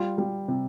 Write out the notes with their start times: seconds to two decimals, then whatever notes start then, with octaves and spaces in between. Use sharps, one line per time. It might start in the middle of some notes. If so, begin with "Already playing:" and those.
Already playing: G3 F4
0.18 G3
0.48 C3